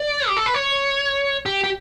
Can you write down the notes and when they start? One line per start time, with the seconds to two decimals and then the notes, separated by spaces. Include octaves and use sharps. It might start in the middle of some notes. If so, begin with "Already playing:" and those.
Already playing: D5
0.28 G4
0.37 A4
0.46 B4
0.54 C#5
1.46 G4
1.64 G4